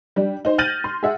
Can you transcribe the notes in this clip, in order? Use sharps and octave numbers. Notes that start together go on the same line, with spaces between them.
G3 D4
D#4 C5
F6 G6 A6 A#6 D#7 F#7
C6
G#4 E5 F#5